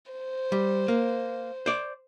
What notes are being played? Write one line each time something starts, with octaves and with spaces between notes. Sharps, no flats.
C5
G3
A#3
C5 D5